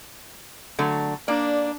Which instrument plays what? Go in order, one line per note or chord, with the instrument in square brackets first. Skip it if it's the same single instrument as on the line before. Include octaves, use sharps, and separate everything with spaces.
[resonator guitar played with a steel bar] D3 F#3 A3
[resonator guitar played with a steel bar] A#3 D5 [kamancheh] D4